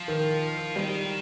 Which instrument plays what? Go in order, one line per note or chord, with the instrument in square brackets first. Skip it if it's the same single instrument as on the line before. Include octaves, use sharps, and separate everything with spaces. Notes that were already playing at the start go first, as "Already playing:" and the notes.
Already playing: [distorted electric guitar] F3
[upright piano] D#3
[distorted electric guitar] D#3 [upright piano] G3